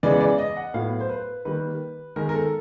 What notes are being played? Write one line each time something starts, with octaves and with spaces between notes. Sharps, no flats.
C#3 E3 G#3 B3 D5
D5
D#5
F#5
A2 F#3 B3 F5
C5
B4
D#3 G3 A#3 B4
D#3 G#3 B3 A#4
A#4
A4